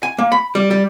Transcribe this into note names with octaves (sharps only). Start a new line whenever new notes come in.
G#5
A#3
B5
G3
G3